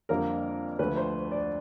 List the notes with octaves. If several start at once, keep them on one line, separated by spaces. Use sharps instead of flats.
F2 D3 G3 A#3 A#4
D2 D3 F3 A3 B4
C5
D5